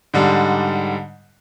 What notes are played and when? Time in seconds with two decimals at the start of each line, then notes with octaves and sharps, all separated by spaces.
0.14 G#2 D3 G3